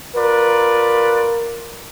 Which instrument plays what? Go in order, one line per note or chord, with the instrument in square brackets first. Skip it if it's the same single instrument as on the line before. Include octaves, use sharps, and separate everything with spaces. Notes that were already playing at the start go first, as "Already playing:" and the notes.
[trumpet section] F4 B4 D5 [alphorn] A#4